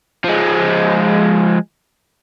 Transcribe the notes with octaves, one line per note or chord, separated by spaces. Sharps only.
F3 G#3